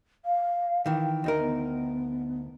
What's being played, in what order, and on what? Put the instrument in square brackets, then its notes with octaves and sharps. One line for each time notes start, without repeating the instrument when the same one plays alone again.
[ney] F5
[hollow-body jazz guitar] D#3 E3 [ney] G5
[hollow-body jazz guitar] D2 D#4 A#4
[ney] B3